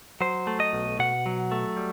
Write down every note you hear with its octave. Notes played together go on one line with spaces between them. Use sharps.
F#3 C5
A3
D#5
B1
B2 F#5
F#3
A3
G3